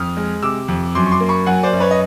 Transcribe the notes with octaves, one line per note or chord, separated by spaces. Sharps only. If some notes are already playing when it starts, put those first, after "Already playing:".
Already playing: F2 D#6 F6
G#3
C3 D6 E6
F2
F#2 C6 D6
C#6
C6 D6
A#3
B5 C#6
F#3 F#5 G#5
C5 D5
F#2
B4 C#5
D#5